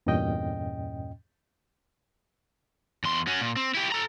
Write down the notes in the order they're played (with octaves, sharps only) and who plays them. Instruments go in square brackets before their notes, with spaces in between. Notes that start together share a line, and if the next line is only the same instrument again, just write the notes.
[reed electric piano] E2 G2 A#2 C#4 D#5 G5
[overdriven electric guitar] E2 C6
C#4 F#4
A#2
C4
E4 G4
A4 A#5